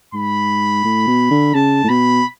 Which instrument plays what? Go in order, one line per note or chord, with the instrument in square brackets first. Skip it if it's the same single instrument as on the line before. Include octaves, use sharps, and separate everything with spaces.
[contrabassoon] G#2 [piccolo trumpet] B5
[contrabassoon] A2
B2
D3
[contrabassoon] C#3 [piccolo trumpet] A5
[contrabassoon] A2
[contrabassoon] B2 [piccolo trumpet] B5